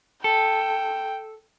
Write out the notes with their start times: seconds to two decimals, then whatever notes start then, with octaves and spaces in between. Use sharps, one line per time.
0.24 A4 G5